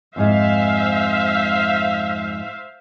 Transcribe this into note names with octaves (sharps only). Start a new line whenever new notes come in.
F2 G#2 G#3 C5 E5 F5